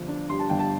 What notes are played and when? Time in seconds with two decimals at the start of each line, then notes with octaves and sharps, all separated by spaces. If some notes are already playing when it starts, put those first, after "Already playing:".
Already playing: G1 G2 F3
0.08 D4
0.29 G2 C6
0.39 A5
0.49 G1 G5
0.59 A5